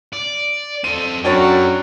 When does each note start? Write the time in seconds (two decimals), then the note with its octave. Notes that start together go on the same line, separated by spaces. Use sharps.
0.13 D5
0.84 C4 A4 D#7
1.24 F#2 D4 F#4 A4 A#4 C#5 G5 A6